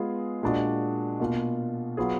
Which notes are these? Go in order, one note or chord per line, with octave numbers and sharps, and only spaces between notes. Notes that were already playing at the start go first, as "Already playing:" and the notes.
Already playing: G#3 B3 F4 G#4
A#2 G#3 D4 F#4
B2 A#3 F4
F#3 B3 F4 G#4